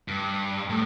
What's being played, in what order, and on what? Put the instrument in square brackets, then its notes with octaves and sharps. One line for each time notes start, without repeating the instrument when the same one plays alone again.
[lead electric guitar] G2
A2